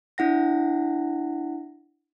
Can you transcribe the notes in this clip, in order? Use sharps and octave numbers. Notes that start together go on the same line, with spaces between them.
D4 E4 F#5 A#6